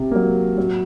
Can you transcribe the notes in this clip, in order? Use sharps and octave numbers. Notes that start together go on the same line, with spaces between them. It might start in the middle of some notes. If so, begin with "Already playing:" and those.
Already playing: C3
F#3 A#3
F#3